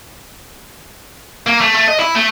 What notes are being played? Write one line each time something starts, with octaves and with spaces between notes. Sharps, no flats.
A#3
A3
A3
D#5
E4
A3